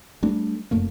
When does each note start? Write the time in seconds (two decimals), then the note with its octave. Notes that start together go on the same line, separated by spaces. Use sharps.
0.23 G3 A3 D4
0.71 F1 F#2 A3 A#3